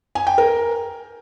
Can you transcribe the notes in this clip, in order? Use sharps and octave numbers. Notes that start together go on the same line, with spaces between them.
G#5
G5
A#4